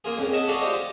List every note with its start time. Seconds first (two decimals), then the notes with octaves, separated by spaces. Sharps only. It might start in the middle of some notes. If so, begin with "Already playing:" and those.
0.04 A#3 F4 G#4
0.18 F2 C#3
0.32 D#5 E5 F#5 A5
0.48 F#4 G#4 A4 C#5 D5 F5
0.61 F4 G4 C5 D5 D#5
0.74 A5